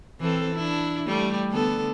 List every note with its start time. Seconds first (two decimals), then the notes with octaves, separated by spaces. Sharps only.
0.20 E3 C4 A4
0.55 D4 E4
1.07 G3 A3
1.50 D3 B3 A4